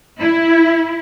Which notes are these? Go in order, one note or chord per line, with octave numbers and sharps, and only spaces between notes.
E4